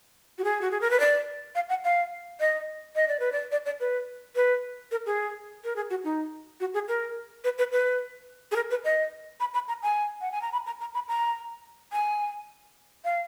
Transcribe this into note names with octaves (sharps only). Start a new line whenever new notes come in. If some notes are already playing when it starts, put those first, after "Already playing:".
F#4
G#4
F#4
G#4
A#4
B4
D5
F5
F#5
F5
D#5
D#5
D5
B4
D5
D5
D5
B4
B4
A#4
G#4
A#4
G#4
F#4
D#4
F#4
G#4
A#4
B4
B4
B4
G#4
A#4
B4
D#5
B5
B5
A#5
G#5
F#5
G#5
A#5
B5
A#5
A#5
B5
A#5
G#5
F5